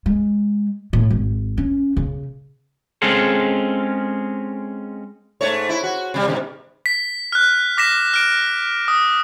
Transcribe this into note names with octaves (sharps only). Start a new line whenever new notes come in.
G#3
A2
G#1
C#4
C#3
G#3 C4 C#4 F4 G#4 A4
G#2 A3 C#5
E4
F#4
C3 G3
G#2 B2 D#3
B6
F6 F#6
D6 A#6 B6 E7
F6 D7
D#6